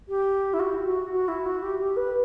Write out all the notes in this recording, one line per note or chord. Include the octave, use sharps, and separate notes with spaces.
G4
E4
F#4
F#4
F#4
E4
F#4
G4
G4
B4